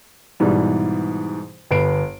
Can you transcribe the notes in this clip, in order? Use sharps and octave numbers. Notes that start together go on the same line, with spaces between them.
G#2 B2 E3 G3
G1 B4 C7 D7